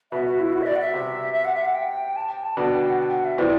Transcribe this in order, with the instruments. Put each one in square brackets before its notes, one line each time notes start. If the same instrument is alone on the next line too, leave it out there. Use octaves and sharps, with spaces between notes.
[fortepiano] B2 [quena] E5
[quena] F#4
E4
F#4
E5
D5
F#5
E5
[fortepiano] C3
[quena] E5
F#5
E5
F#5
G5
A5
G5
A5
[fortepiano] B2 D3 [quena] G5
[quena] F#5
G5
F#5
E5
[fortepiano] C3 E3 [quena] D5